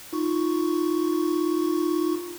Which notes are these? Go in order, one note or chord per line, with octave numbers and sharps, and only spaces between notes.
D#4 F4 C#6